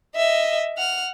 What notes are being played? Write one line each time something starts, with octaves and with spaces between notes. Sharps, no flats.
D#5 E5
F#5 F6